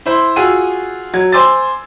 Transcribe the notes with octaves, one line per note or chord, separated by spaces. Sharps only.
E4 C5 C6
F4 F#4 G#4 E6 D#7
F#3 G#6
C5 G#5 C6 D6 E6 A6